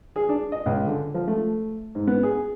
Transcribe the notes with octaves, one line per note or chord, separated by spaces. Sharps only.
G#4
D4
D#5
C#2
D3
F3
A3
G#2
B3
G#4